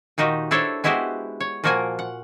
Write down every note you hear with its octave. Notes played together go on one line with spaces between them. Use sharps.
A#2 D#3 D#4 F#4 G4
D4 E4 A4 C5 C#5
G#3 B3 E4 F#4 G4 C5
C#5
A#2 F3 A#3 F#4 A#4 G#5
F#5